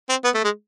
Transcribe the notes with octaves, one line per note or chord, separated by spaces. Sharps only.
C4
B3
A3
G#3